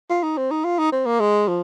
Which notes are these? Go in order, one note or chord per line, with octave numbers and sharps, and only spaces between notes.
F4
D#4
C4
D#4
F4
D#4
C4
A#3
G#3
F3